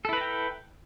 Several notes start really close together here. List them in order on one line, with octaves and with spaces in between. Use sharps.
A4 E4 B4 A#5 G5